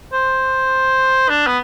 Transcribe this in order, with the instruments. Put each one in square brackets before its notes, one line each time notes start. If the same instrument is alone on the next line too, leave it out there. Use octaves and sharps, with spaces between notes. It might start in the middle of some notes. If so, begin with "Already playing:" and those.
[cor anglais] C5
D4
B3